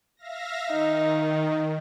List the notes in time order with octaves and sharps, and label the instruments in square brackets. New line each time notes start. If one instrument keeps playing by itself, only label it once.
[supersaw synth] E5 F5 A#6
[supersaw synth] D#3 [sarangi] D#4